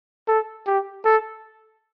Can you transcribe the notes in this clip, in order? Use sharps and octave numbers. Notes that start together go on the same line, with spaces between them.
A4
G4
A4